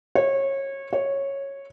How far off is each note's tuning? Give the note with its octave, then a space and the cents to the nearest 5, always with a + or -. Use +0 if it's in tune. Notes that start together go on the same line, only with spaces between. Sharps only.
C#5 -25
C#5 -10